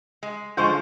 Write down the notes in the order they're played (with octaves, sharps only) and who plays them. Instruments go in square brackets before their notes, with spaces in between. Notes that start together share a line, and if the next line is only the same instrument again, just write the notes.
[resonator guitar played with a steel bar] G#3
[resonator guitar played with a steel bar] D3 F3 C5 [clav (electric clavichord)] G#3 F4 [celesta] C#6 G6